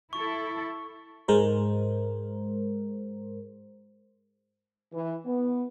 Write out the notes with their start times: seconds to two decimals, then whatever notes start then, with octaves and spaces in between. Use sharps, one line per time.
0.13 E4 A4 C#6
1.28 G#2 G#3 A#4 C5
4.93 E3
5.26 B3